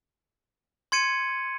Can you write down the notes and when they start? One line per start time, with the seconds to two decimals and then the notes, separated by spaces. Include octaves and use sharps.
0.92 C6 G#6 C#7 D#7